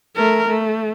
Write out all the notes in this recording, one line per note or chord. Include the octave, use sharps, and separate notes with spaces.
A3 A#4
A3